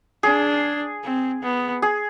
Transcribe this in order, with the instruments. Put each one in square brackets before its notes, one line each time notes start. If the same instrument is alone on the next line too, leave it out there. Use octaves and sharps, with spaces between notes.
[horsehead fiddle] D4 [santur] G#4
[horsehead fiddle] C4
B3
[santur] G#4